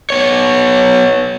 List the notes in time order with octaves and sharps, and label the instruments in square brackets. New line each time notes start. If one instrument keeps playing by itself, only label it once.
[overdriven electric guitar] B3 C#5